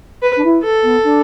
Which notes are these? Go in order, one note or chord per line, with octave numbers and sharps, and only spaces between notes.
B4
D4
E4
A4
B3
D4